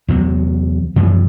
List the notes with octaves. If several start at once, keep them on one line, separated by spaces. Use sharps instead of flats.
E2 C3 F#3
F#2 C3 E3 F3